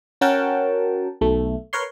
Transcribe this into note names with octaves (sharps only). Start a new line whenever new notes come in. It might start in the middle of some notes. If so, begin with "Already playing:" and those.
C#4 F#4 A#4 F#5 G5 A5
B1 A3
A#4 B4 C#5 C6